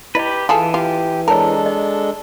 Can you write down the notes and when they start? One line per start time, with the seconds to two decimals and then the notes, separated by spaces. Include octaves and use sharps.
0.15 E4 G4 B4 D#5
0.49 E3 F4 G#4 A4
0.74 F4 G4
1.28 G#3 D4 A4 A#4 C#5 A5
1.66 D#5